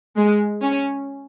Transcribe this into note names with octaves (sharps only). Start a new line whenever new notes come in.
G#3
C#4